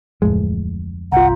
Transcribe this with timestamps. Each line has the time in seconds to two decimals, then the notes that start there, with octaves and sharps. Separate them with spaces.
0.22 D1 F2 A2 G#3
1.12 G1 C2 F4 F#5 A#5